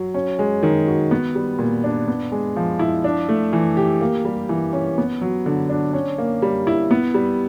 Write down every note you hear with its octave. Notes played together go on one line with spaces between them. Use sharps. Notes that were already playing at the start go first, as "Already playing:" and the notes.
Already playing: F#3
C#4
G#3
D#3
F#4
B3
G3
A#2
D4
B3
G#3
F3
E4
D4
A3
E3
G4
A#3
G3
E3
C#4
B3
F#3
D3
D4
C#4
A#3
G3
E4
B3
G3